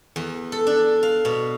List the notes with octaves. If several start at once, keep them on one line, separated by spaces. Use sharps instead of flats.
E2
A4
D4
F5
B2